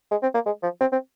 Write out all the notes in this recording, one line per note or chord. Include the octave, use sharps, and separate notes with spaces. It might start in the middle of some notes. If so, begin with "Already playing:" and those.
G#3
C4
A#3
G#3
F3
C4
C4